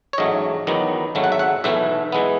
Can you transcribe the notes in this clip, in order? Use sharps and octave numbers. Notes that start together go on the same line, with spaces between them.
C#5
A1 G#2 F#3 A3 D#5
E2 D#3 F#3 B3
G#1 G#2 F#3 A3
F#5
E5
F#5
B1 A2 E3 A3 E5
E3 G#3 B3